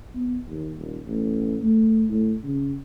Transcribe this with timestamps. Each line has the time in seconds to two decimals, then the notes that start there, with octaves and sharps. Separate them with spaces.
0.15 B3
0.48 D#2
0.78 D#1
1.06 A1
1.61 A3
2.09 A2
2.44 C#3